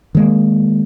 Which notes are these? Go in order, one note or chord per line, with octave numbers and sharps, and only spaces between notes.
D#3 G#3 A#3